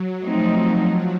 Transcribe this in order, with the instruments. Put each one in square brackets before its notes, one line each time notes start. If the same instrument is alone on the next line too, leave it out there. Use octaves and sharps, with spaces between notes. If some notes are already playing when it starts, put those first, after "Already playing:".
Already playing: [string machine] F#3
[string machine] F3 [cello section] A3 C4 D#4